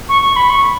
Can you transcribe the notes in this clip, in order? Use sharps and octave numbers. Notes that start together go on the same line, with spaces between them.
C#6
C#6
B5
C#6